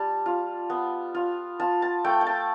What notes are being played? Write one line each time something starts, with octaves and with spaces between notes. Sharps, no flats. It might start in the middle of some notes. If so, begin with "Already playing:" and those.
Already playing: G3 A5
F4
B3
F4
F4 A5
A5
A3 G5
G5
A5